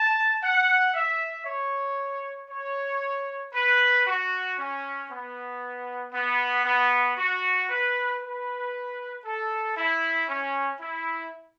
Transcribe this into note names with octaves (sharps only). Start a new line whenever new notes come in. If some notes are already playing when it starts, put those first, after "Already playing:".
Already playing: A5
F#5
E5
C#5
C#5
B4
F#4
C#4
B3
B3
B3
F#4
B4
B4
A4
E4
C#4
E4